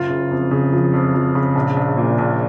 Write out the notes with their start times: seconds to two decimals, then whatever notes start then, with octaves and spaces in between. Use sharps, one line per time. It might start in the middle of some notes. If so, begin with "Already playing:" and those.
Already playing: F#1 F4
0.09 C#3
0.31 F2
0.51 C#3
0.73 F3
0.93 F2
1.14 F3
1.35 C#3
1.55 A#1
1.77 A#1
1.97 A#2
2.18 A#1